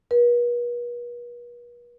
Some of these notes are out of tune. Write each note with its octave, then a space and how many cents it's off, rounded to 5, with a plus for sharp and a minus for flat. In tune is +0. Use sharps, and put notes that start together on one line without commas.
B4 -45